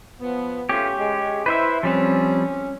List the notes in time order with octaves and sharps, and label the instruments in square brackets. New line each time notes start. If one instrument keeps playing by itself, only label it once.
[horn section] F3 B3
[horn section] C#3 A3 F4 [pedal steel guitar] C#4 G4
[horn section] G#3
[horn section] E4 [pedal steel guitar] B4 C5 E5
[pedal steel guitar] F3 G3 C4 [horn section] C#4